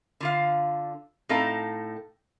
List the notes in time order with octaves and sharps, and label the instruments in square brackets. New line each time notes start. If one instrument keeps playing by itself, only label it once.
[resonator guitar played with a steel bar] D3 F4 F5
A2 C4 D#4 A4 F5 A#5